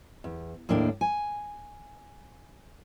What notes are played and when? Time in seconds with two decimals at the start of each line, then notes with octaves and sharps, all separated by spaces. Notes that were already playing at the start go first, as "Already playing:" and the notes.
0.24 E2
0.69 D#2 A2 A#3 D4 G5
1.01 G#5